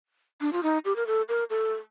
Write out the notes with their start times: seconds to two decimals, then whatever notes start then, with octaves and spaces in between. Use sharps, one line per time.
0.41 D4
0.53 F4
0.63 D#4
0.85 G4
0.96 A#4
1.07 A4
1.29 A#4
1.50 A4